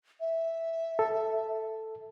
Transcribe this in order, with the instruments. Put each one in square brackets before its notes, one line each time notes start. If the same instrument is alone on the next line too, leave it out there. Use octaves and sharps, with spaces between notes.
[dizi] E5
[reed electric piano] A4